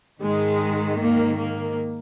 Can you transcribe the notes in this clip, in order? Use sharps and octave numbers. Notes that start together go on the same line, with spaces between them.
G#2 D#3 G#3
A#3
A#3